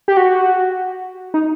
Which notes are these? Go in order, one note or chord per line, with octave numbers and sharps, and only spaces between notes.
G4
F#4
D#4